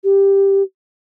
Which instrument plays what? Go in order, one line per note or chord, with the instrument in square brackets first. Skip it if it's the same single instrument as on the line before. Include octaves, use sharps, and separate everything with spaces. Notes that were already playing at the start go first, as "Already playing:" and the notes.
[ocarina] G4